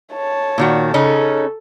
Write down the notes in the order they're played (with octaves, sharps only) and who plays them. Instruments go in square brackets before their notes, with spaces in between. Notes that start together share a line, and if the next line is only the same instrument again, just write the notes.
[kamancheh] C#5 A5
[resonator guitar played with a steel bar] A#2 D#3 F#4
[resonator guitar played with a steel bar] C#3 C#4 D#4 [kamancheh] A4